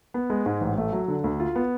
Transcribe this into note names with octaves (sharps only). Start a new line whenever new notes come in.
B3
G#3
G#2
A1
A3
F#3
D3
D2
F4
B3